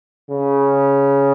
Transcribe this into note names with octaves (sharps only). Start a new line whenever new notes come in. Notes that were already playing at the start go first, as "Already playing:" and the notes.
C#3